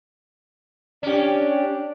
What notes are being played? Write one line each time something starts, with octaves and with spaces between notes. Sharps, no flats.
C#4 D4 G4